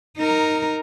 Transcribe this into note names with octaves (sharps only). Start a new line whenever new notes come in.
D#4 A#4